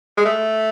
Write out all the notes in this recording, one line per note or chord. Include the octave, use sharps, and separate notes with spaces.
G#3
A3